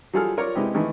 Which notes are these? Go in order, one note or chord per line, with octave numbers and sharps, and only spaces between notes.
F#3 G3 F4 G#4 A4 F6
F4 A#4 C#5 D5
C3 G#3 B3 D#4 E4 G4
D#3 E3 A3 D#4